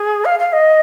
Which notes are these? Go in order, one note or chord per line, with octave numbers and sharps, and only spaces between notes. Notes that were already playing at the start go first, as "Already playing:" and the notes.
Already playing: G#4
F5
F5
D#5